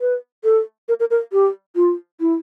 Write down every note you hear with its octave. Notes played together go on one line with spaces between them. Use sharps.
B4
A4
A#4
A#4
A#4
G4
F4
E4